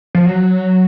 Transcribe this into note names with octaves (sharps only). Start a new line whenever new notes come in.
F3
F#3